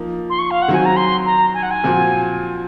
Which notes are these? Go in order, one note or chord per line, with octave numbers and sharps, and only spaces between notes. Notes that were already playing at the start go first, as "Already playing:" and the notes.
Already playing: F3 A#3 D#4
C6
C#6
F5
F#5
D#3 F#3 C4 F#4 G#5
A#5
C6
A#5
G#5
F#5
G#5
A#2 F3 C4 F#4